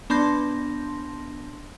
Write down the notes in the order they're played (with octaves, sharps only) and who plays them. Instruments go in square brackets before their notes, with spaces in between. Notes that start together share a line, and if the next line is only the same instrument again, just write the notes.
[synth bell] B3 D4 A5 C6 G6 A#6